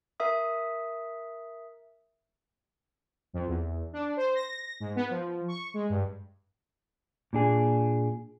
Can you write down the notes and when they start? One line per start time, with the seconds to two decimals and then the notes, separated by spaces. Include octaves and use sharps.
0.20 A#4 E5 D#6
3.33 F2
3.48 E2
3.93 D4
4.17 C5
4.35 A#6
4.80 G#2
4.96 B3
5.10 F3
5.48 C#6
5.74 G#3
5.90 G2
7.33 A#2 D4 G#4